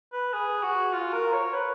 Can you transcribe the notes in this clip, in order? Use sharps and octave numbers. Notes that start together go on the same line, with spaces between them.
B4
G#4
F#4
F4
A#4
C#5
B4